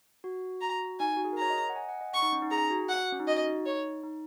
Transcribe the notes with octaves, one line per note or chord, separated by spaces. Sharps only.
F#4
A#5
D#4 G#5
F#4
G#4
A#4
C#5 A#5
D#5
D#5
F#5
G#5
F#5
D#5
F#5 C#6
D#4
C#4
D#4
G#4 A#5
F#4
F#5
C#4
D#4
F#4 D#5
D#4
C#5
D#4